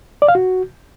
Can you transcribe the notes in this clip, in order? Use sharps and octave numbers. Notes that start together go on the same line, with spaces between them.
D5
F5
F#4